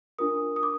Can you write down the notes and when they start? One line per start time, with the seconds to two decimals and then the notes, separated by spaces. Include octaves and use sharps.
0.19 D4 F4 A#4 D#6
0.56 D#6
0.63 D6